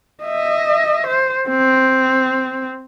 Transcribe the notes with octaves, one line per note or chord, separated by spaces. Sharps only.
D#5 E5
C5
C4